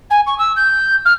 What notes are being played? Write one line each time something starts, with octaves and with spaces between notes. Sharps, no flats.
G#5
C#6
E6
G6
F6